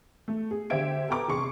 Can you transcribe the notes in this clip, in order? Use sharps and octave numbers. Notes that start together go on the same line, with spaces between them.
A3
G#4
D3 G4 C5 E5 G#6 D7
A4 B4 G5 A#5 D6
F1 G#4 C6 C#6 C#7